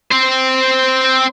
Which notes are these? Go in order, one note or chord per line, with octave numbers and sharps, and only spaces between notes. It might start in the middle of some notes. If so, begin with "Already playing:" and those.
C4 C5